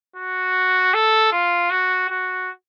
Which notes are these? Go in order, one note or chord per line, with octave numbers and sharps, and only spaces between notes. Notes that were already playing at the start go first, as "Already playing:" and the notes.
F#4
A4
F4
F#4
F#4